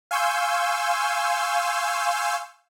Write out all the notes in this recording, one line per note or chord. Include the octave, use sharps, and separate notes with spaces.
F5 G#5 C6 C#6 E6 G6